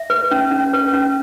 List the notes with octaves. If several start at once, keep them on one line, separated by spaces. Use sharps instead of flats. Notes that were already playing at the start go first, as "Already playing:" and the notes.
Already playing: E5
B4
C#4
C#4
B4
C#4